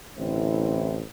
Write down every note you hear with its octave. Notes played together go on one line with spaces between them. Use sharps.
A1 D3 C4 E4